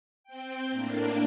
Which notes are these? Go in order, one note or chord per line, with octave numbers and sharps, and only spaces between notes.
C4 G5
A2 A#3 D4